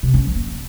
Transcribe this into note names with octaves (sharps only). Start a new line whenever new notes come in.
C3
C#4
F3
A#3